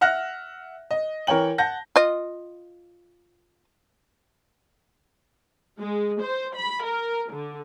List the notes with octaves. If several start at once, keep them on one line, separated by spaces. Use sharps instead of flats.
E5 F#5 F6 F#6 A#6
D#5
E3 A#4 C#5 G5 F#7
F#5 A5 G6 A#6
F4 D#5
G#3
C5
B5
A#4
D3